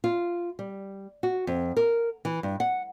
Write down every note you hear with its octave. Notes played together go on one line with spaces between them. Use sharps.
F4
G3
F#4
F2
A#4
E3
G2
F#5